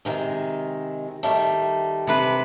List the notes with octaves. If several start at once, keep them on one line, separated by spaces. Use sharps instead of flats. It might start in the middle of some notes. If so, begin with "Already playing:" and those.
C3 D#3 G#3
D#3 G3 A3
C3 B4